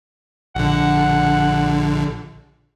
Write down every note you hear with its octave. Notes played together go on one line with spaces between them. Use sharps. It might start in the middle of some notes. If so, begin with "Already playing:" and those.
A#1 D3 F#5